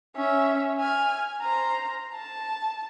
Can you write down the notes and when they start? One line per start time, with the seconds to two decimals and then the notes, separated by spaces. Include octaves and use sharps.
0.16 C#4 E5
0.80 G#5 F6
1.41 C5 A#5
2.15 A5